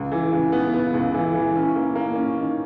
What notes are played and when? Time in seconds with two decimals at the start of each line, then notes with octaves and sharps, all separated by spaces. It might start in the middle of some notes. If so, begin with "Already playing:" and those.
Already playing: C#2
0.12 E3
0.32 C#3
0.52 B3
0.74 B3
0.94 C#2
1.14 E3
1.34 E3
1.56 C#4
1.76 A#3
1.96 A#3
2.16 C#4
2.37 D#3